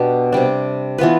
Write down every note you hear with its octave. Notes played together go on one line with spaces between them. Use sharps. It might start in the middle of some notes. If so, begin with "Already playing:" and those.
Already playing: B2 B3 D4 G4
C3 G3 D4
E3 B3 F4 B4